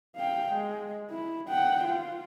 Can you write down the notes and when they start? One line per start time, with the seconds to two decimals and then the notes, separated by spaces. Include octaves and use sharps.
0.16 F5 G5
0.52 G#3
1.11 E4
1.50 F#5 G5
1.85 F4